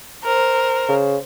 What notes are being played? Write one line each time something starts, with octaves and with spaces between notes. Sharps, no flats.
A#4 C5
C#3